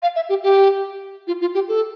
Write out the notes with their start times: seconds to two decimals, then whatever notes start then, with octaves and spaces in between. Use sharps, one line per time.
0.03 F5
0.16 E5
0.29 G4
0.43 G4
1.27 F4
1.41 F4
1.55 G4
1.69 A4